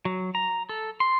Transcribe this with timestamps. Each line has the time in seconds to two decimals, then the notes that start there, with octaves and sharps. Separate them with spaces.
0.05 F#3
0.35 A#5
0.69 A4
1.00 C6